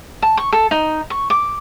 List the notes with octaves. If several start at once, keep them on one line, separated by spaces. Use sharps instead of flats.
A5
C#6
A4
D#4
C#6
D6